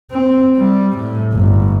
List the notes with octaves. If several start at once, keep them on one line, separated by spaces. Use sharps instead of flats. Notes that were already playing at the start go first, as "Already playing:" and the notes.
C4
G3
A2
G1